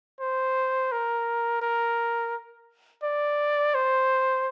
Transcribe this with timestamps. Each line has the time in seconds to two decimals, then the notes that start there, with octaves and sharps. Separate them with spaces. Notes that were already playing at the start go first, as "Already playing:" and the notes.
0.20 C5
0.92 A#4
1.62 A#4
3.03 D5
3.75 C5